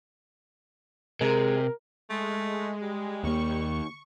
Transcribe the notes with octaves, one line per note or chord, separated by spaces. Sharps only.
C3 G#3 A#4
G#3 A3
G3
D#2 A#3 C#6